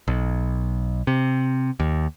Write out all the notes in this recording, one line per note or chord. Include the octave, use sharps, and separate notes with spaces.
B1
C3
D#2